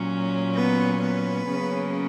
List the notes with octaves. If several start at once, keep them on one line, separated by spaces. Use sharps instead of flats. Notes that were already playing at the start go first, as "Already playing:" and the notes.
Already playing: A#2 F#3 C#4
B3 B4
B3 B4
C#3 F#3 A#3 C#4